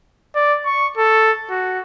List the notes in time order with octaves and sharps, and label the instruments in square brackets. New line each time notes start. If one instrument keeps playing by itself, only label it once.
[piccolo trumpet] D5
C#6
A4
F#4